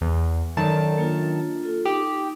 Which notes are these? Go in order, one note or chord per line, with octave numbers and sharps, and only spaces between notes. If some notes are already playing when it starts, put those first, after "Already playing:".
E2
F#2 D#3 A4 D5 A5
A#3 D4 F4
F4 A4
D#4 G4